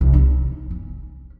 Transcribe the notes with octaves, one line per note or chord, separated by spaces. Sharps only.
C2
D#4
C#4